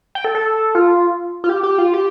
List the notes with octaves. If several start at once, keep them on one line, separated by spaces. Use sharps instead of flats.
G5
A4
A4
F4
F4
G4
G4
F4
G4